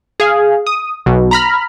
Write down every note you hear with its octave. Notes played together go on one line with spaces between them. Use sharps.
G#4 F5
D#6
B1 B2
A#5 B5 F6